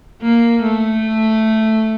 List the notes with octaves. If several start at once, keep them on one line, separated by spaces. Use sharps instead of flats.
A#3
A3